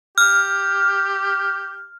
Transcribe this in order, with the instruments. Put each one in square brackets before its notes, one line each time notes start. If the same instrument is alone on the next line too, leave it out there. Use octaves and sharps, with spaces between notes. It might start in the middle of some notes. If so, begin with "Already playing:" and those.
[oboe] G4 [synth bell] F6